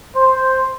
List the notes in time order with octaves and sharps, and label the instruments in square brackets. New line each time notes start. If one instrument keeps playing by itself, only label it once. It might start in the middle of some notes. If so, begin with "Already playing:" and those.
[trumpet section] C5